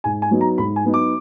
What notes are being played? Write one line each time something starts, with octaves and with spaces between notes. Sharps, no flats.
G#2 G#5
G#5
F#3 B3 D#4
A#5
G#2 B5
G#5
F#3 B3 D#4
D6